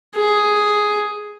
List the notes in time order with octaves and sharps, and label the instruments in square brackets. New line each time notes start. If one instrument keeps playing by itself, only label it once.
[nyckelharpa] G#4